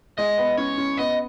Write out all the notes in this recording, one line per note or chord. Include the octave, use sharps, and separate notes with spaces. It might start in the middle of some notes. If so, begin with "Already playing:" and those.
G#3 D#5
B3
C#4 C#5
C#4
B3 D#5